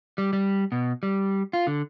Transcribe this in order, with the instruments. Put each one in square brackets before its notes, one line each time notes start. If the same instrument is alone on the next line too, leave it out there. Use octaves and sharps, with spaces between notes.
[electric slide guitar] G3
G3
B2
G3
F4
D3